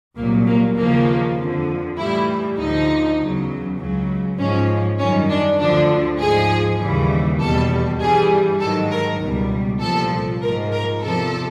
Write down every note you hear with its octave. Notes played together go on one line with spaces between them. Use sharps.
C2 A#2 F#3 A#3
A#3
D#2 C#3 F3 A#3
F2 D3 F3
A2 E3 G3 E4
D2 D3 F3 D#4
E2 C#3 F#3
C#2 C#3 F#3
G#2 F3 C#4
F#2 D#3 G3 C#4
D4
D2 D3 F3 D4
G#2 F3 G#4
D#2 C#3 E3 G3
E2 B2 G3 A4
G2 E3 G3 G#4
G#2 D#3 F#3 A4
A#4
C#2 B2 G3
C2 A#2 F3 A4
G#2 F3 A#4
A#4
E2 C3 F3 A4